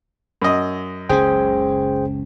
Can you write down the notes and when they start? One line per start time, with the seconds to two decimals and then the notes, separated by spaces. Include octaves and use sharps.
0.42 F#2 D#5
1.09 F#1 C#2 C#4 G#4 C5 G5